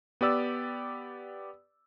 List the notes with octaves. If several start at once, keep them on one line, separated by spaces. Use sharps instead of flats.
B3 G4 D5 E6